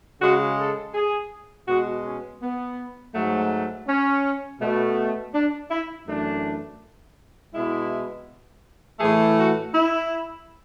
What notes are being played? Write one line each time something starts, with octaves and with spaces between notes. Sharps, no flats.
C#3 G#3 F#4
A4
G#4
B2 G#3 F#4
C#4
B3
G#2 F#3 A3
C#4
B2 A3
D4
E4
F#2 E3 A3 D4
B2 G#3 E4
A2 E3 A3 G#4
F#4
E4